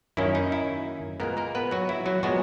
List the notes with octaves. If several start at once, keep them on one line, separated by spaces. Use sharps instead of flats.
F#2 D#3 A#3 C#4 E4
D#4
E4
A#2 G#3 A#3 B3 A#4
A#3 A#4
B3 B4
F#3 F#4
E4
F#3 F#4
A#2 F#3 G#3 B3 F#4